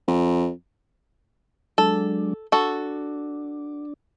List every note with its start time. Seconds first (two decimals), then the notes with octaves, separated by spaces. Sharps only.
0.08 F2
1.78 F#3 G#3 D4 A4
2.52 D4 F#4 A4